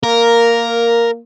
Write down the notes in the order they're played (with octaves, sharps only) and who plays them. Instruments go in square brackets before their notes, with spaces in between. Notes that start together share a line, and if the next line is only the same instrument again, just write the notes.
[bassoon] A#3 [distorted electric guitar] A#4